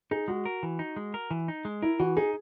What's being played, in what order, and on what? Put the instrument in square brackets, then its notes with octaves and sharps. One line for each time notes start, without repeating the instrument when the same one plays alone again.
[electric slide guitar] D#4 [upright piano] G#4
[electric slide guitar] G#3 [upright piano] F#4
[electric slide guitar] A#4
E3
D#4
G#3
A#4
E3
D#4
G#3
[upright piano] E4 [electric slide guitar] A#4
[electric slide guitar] E3 [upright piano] F#4
[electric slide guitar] D#4 [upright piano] G#4